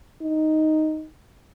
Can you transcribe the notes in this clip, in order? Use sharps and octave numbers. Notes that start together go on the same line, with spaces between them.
D#4